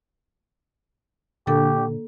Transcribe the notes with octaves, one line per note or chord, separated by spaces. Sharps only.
A#2 D3 A#3 G4 A4